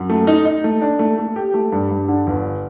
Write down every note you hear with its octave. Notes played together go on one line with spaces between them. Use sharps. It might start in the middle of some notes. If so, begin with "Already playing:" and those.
Already playing: F#2
A3
D#4
D#4
A3
D4
A3
A3
G4
A3
G2
G2
D3
G1